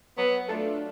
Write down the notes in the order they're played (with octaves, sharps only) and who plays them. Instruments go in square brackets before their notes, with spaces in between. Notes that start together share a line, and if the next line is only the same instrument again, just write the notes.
[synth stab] F#3 [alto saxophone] B3
[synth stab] A3 D4 F4 A4